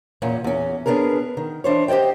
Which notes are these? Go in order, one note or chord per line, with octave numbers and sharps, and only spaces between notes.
E2 A#2 C#4
E2 C#4
B3 C#4 D4 G#4 A#4
D#3
E3 D4 C5 C#5
G4 C5 D5 D#5 G5